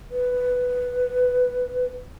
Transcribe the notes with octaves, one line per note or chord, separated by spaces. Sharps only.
B4